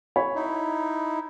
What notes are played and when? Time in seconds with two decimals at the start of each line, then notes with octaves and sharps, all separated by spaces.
0.16 C#5 B5
0.35 D#4 E4